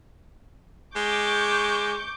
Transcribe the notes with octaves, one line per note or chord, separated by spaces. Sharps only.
G#3 C#6 D6 G6